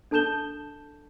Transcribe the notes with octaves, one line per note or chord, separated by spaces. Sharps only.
D4 A4 A5 G6 E7 G7